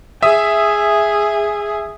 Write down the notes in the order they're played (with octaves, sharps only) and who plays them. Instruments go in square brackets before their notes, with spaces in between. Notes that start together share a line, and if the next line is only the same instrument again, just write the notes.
[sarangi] G#4 [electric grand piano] E5 D#6